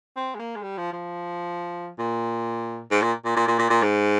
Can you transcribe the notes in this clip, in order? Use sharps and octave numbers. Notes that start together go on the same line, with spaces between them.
C4
G#3
A#3
G#3
G3
F3
F3
A#2
G#2
A#2
A#2
A#2
A#2
A#2
A#2
G#2